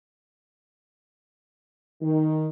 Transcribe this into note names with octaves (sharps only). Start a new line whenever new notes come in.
D#3